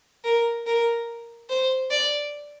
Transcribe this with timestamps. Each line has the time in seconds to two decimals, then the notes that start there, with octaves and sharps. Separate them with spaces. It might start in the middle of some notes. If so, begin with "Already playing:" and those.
0.24 A#4
0.66 A#4
1.49 C5
1.90 D5